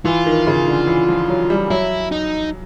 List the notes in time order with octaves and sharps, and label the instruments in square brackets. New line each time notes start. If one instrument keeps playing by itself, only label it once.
[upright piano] E3 [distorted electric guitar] F4
[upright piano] D#3
C#3
D3
E3
F3
F#3
G3
[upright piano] F#3 [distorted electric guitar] E4
[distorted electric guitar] D#4